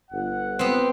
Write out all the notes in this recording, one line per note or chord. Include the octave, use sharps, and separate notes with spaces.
G1 F#5
B3 C4